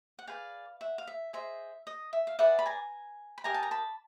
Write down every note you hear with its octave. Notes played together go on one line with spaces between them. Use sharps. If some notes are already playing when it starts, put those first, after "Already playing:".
F#5
G#4 B4 D5 F5 G5
E5 F#5
F5
E5
G#4 C5 D#5 E5
D#5
E5
F5
G#4 B4 D5 E5 F#5
B5
G#5 A#5
B5
G4 A#4 D#5 G#5 A#5
A5
A#5
A5 B5